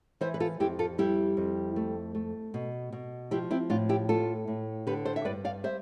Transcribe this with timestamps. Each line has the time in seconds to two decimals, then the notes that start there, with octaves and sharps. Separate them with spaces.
0.21 E3 C5 E5
0.34 B4
0.40 F4 A4
0.60 F2 E4 G4
0.79 F4 A4
0.98 G3 E4 G4
1.37 F2
1.76 A3
2.15 A3
2.54 B2
2.92 B2
3.31 F3 E4 G4
3.51 C4 E4
3.70 A2 D4 F4
3.89 E4 G4
4.09 A3 F4 A4
4.47 A2
4.87 D3 G4 B4
5.05 A4 C5
5.16 E5
5.25 G2 B4 D5
5.45 D5 F5
5.64 G3 C5 E5